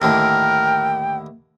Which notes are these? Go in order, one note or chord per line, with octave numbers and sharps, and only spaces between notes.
D#2 A2 D3 A#4 G5